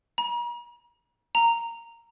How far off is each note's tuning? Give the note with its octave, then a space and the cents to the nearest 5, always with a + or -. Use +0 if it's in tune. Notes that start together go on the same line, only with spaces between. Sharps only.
A#5 +45
A#5 -10